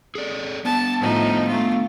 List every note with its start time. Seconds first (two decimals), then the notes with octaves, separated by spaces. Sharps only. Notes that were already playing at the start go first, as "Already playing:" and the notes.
0.15 G#4 A4 D5
0.65 B3 D4 A5
1.01 A2 F3 D#4
1.48 A3 F4